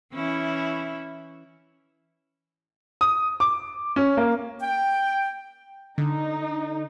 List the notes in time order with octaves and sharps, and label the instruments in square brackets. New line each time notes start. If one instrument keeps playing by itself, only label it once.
[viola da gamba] E3 C#4 E4
[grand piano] D#6
D6
C#4
A#3
[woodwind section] G5
[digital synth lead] D3 [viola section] D#4